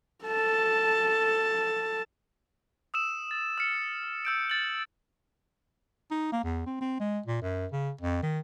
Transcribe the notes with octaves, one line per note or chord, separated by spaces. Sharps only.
A4 A5
D#6 E6 E7
A6
E6 F6 C#7
E6 G6 D7
A6 F#7
D#4
A#3
E2
C4
C4
G#3
A#2
F#2
C#3
F2
D#3